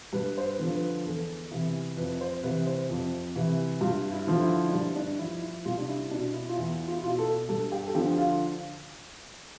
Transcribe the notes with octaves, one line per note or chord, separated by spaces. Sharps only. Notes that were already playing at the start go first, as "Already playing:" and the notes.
G2 B4
C5
B4
D3 F3
B4
E2 A4
C3 E3
F2 B4
C5
C3 E3 B4
C5
F2
C3 E3
G2 F4
E4
D3 F3
E4
D4
G2 E4
D4
F3 E4
E4
C2 F4
D4
E4
B2 D4
E4
F4
E2 E4
F4
E4
B2 F4
A4
G2 A4
G4
A4
D3 F3 G4
F4